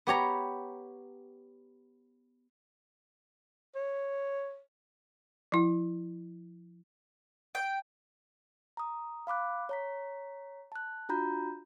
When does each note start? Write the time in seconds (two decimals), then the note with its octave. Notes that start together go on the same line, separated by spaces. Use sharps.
0.07 B3 G4 C#5 A#5
3.75 C#5
5.52 F3 E4
7.55 G5
8.77 A#5 D#6
9.27 F5 B5 D6 F#6
9.69 C#5 A#5 B6
10.72 A5 F#6
11.09 D4 F4 F#4 A#5 B5 G6